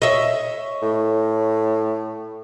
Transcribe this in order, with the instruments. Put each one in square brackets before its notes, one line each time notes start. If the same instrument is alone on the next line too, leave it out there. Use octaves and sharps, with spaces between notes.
[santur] C#5 [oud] D#5 E5
[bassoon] A2